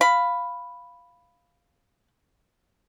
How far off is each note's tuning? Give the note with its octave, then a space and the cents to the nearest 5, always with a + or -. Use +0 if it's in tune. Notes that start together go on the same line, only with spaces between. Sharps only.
F5 +0 B5 +0